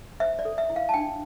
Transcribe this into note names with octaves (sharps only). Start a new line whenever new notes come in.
C5 E5
D5
A4
E5
E4
F5
A5
D4 G5